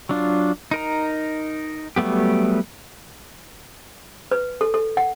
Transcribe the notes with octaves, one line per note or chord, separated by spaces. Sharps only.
F#3 D4 F4
D#4 A#4 A#5
F#3 G3 A3 B3 G4
B4
A4
A4
F#5